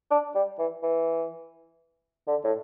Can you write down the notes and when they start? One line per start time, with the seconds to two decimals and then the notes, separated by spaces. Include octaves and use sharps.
0.11 D4
0.35 G3
0.59 E3
0.83 E3
2.28 D3
2.44 A2